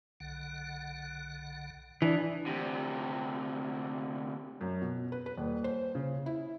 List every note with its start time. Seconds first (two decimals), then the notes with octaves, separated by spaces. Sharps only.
0.20 B1 D3 F#5
2.02 E3 D4 D5
2.46 D2 C3
4.61 F#2
4.82 B2
5.12 B4
5.26 B4
5.38 D#1
5.64 C5
5.95 C#3
6.26 E4